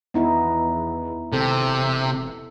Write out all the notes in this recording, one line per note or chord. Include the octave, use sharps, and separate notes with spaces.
E2 B3 D#4 E4
G#1 C3 A4
E1